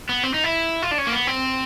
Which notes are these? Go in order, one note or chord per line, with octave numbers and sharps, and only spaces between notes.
B3
C4
D#4
E4
F4
D4
C#4
A#3
B3
C4